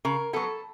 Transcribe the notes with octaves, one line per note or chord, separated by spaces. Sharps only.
C#3 A#4
F#3 B3 A4